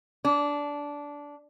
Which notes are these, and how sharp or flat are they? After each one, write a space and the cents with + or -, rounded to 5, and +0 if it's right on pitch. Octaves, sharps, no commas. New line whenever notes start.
D4 -15